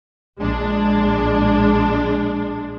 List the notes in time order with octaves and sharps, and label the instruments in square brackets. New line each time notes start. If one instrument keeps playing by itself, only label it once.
[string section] A#1 G#3 D4